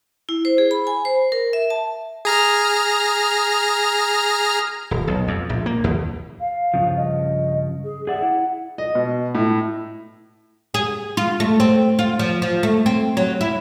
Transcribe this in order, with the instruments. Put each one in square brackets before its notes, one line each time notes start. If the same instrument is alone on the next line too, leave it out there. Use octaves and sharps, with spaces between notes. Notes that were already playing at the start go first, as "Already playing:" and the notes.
[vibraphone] E4
C5
G#4
B5
G#5
C5
A#4
E5
A5
[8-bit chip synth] G#4 A#5 F6
[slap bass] D#1
B1
F2
A#1
A#3
D#2
[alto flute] F5
[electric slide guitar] G2 C#3 F3
[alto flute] D#5
G#4
[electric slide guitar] G#4 D5 E5 [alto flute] F#5
[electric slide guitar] E4
[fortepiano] D#5
B2
A2
[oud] G#4
F4
A3
C4
F4
F3
F3
A3
C4
F#3
E4